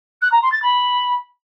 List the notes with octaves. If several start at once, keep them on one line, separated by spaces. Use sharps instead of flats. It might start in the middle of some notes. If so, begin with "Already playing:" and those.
F#6
A#5
C6
A6
B5